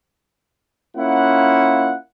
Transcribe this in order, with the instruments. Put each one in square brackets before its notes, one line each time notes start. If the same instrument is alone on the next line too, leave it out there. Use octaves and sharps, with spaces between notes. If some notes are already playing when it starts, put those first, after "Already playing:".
[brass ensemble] A#3 C#4 E4 F4 F#5